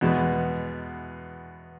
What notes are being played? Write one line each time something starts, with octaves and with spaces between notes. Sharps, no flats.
E2 B2 G#3 B3